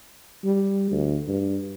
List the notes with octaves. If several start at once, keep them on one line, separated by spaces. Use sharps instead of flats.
G3
D2
G2